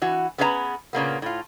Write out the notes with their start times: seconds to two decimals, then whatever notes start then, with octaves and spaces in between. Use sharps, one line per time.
0.02 E3 F#4
0.38 B3 C#4 G#4 B4 F5 A#5
0.93 A#2 C#3 A#3 B3
1.22 A2 F4